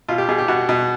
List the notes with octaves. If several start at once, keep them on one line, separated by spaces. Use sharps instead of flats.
B2 F4
G4
B2 G#4
G4
B2 F#4
B2